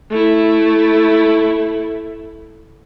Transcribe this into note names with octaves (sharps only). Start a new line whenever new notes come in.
A3 E4